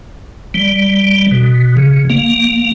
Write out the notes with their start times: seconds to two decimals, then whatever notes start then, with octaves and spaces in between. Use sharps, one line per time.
0.54 G3
1.31 B2
1.77 C#3
2.10 A#3